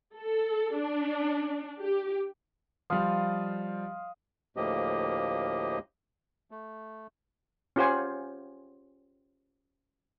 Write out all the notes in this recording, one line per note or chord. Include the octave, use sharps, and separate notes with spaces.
A4
D4
G4
F3 G3 D#5 F5 C6
D2 A2 F3 A#3 G4 D#5
A3
C#4 F4 G4 C5 F#5 G#5